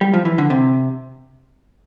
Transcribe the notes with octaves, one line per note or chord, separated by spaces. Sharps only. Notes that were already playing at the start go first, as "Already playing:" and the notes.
G3
F3
E3
D3
C3